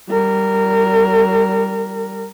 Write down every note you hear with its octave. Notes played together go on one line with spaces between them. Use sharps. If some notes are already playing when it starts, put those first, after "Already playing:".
G3 A#4